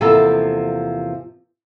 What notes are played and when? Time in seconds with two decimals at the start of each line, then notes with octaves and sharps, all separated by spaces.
0.01 E2 C3 F3 A#3 B3 A4